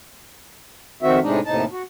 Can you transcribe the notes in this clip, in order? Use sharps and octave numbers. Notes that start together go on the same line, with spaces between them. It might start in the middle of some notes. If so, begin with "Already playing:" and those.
F2 D#3 C4 F#4 E5
A2 C3 G#3 D4 D#4
D#2 A2 C3 D#4 A5
F#4